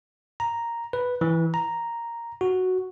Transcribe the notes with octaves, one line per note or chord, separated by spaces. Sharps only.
A#5
B4
E3
A#5
F#4